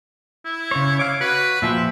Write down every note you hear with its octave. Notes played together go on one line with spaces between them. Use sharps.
E4
C#3 C#5
C#5 F5 D6
F#4 B4
A#2 F3 G4 E5